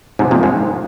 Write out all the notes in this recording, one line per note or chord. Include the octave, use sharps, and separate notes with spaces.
G#2 C3
F2 A#2
G#2